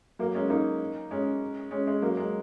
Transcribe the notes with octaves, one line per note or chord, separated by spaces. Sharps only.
F#3 A#3
G#3 C#4
A#3 D#4
G#3 C#4
G#3 C#4
G#3
F#3 A#3
G#3